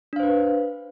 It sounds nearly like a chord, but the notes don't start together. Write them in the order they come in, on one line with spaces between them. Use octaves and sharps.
D4 F5 C5 B4